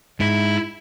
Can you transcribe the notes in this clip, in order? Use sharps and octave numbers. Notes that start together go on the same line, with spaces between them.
G#2 E4